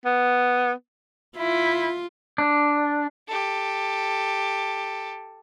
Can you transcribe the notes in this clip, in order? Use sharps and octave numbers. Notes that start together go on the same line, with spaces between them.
B3
E4 F4
D4
G4 A4